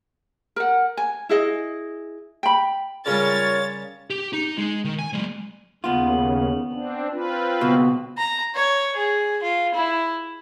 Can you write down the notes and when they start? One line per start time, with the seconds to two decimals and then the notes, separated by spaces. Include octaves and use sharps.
0.56 A#4 F#5
0.97 G#5
1.29 E4 G#4 D#5
2.43 G5 B5
3.06 C#3 G3 F4 A#4 C#5 A6
4.10 G4
4.33 D#4
4.58 G#3
4.84 D#3
4.99 G#5
5.13 F#3 G#3
5.84 D#2 C#3 B3 F4
6.72 C4 D4
7.12 C4 F4 B4
7.61 C#2 B2
8.18 A#5
8.55 C#5
8.96 G#4
9.43 F4
9.75 E4